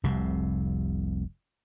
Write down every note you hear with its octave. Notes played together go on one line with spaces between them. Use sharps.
F1 C2 C3